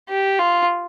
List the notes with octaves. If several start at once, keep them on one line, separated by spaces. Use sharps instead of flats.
G4
F4